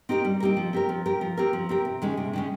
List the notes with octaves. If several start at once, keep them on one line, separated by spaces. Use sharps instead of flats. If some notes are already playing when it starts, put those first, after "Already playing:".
C4 D#4 G4 A#4
G3
C4 D#4 G4 A#4
F3
C4 G4 A#4
F3
C4 G4 A#4
F3
C4 G4 A#4
F3
C4 G4 A#4
C3
D#3 G#3 C#4
C3
D#3 G#3 C#4